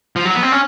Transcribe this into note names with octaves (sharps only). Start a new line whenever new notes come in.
F3
F#3
B3
C4
C#4